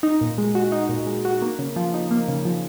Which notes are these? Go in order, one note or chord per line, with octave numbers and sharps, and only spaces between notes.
D#4
A#2
G#3
F#4
D#4
A#2
G#3
F#4
A#3
C#3
F3
D#4
A#3
C#3
F3